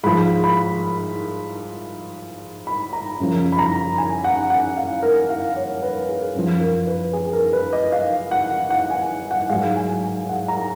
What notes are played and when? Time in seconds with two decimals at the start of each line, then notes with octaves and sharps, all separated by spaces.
0.04 G#2 F3 B5
0.44 B5
2.67 B5
2.93 A#5
3.20 F#2 C#3 F3
3.52 B5
3.59 A#5
3.98 G#5
4.24 F#5
4.50 F#5
4.77 F5
5.03 A#4
5.29 F5
5.56 C#5
5.83 B4
6.09 G#4
6.35 F#2 F3
6.60 A#4
6.87 B4
7.13 G#4
7.33 A#4
7.53 B4
7.73 D#5
7.92 F5
8.31 F#5
8.70 F#5
8.90 G#5
9.31 F#5
9.50 G#2 F#3 F5
9.76 G#5
10.03 G#5
10.29 F#5
10.48 A#5